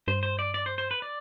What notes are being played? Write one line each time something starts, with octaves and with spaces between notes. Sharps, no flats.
G2 C5
C5
D5
D5
C5
C5
B4
D5